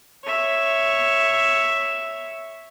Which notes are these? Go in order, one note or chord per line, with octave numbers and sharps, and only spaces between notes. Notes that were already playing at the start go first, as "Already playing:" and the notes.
C#5 E5